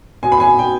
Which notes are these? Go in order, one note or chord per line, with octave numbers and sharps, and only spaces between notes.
B2 G#5
B5
G#5
B2 G5